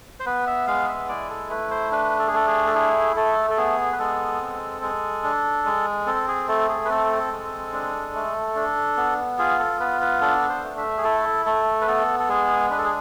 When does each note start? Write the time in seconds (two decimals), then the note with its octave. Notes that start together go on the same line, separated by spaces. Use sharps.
0.20 C5
0.26 B3 B4
0.47 E5
0.67 G#3 F5
0.89 E5
1.09 E4 D5
1.30 A4
1.50 A3 B4
1.71 C5
1.91 D4 B4
2.19 A4
2.28 G#4
2.33 A3 A4
2.47 G#4
2.67 A4
2.75 E4 G#4
3.16 A3 A4
3.50 A4
3.57 B3 G#4
3.92 B4
3.99 G#3 A4
4.41 C4
4.82 G#3
5.24 D4
5.65 G#3
6.07 C4 A4
6.28 G#4
6.48 A3 A4
6.69 G#4
6.85 B4
6.90 C4 A4
7.32 G#3
7.73 D4
8.14 A3
8.55 D4
8.97 B3
9.39 F4 G#4
9.59 A4
9.80 B3 B4
10.01 B4
10.21 D4 A4
10.49 C5
10.63 A3
10.77 E5
10.97 G#4
11.04 E4 A4
11.46 A3 A4
11.81 B4
11.88 B3 A4
12.19 A4
12.29 G#3 G#4
12.70 D4 B4
12.78 A4
12.84 G#4